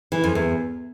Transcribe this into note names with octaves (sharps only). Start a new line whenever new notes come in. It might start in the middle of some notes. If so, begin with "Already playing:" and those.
E3
F2
E2